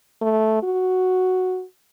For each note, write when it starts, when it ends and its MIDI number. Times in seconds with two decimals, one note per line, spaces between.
0.22 0.60 57
0.63 1.64 66